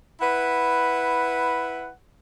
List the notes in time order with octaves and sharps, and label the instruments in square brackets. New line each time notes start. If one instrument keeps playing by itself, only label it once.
[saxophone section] E4 B4 F#5